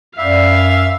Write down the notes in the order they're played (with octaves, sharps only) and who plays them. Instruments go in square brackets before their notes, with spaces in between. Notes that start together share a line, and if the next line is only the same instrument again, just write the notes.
[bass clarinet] F#2 [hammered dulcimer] B4 D5 G5 [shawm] E5 [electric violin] F5